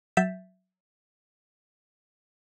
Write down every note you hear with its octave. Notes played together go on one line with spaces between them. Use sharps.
F#3 E5 G6 A6 B6